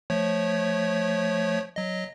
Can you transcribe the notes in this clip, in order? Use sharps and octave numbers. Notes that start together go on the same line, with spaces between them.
F3 A3 C#5
F#3 D#5